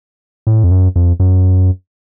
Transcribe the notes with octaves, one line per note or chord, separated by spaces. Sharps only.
A2
F2
F#2
F2
F#2